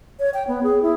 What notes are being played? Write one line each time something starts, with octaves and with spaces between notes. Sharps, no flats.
C#5
G5
B3
G#4
E4